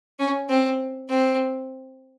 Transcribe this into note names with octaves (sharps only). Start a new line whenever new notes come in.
C#4
C4
C4